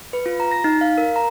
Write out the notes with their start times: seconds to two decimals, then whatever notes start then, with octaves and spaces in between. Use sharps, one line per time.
0.13 B4
0.26 F4
0.40 A#5
0.52 A#6
0.64 D#4
0.81 F5
0.98 A#4
1.16 A#5